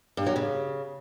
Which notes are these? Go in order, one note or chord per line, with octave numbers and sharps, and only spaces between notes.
G2
F#3
C#3